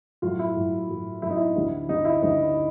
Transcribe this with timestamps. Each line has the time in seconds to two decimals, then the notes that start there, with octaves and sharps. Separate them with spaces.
0.22 A2 F#3 F4
0.39 E4
0.56 A2 F#3
0.89 A2 F#3
1.22 A2 F#3 E4
1.30 D#4
1.37 E4
1.56 D2 D3 G3
1.88 D2 D3 G3 D#4
2.05 E4
2.22 D2 D3 G3 D#4